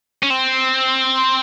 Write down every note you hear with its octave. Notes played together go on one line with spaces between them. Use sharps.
C#4
C4